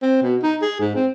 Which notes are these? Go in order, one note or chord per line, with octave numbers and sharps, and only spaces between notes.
C4
B2
D#4
G#4
G#2
C4